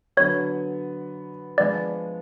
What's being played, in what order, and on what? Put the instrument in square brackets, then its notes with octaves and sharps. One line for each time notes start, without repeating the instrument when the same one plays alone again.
[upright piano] D3 F#3 B3 [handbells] C#5
[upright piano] F3 G#3 B3 D4 [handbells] D5